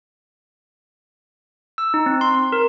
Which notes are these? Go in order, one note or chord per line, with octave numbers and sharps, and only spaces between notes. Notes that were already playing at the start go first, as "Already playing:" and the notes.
E6
D#4
C4
C6
C6
A#4